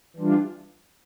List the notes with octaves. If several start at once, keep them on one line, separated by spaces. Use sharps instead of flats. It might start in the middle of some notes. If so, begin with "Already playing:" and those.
E3 G3 D4 F4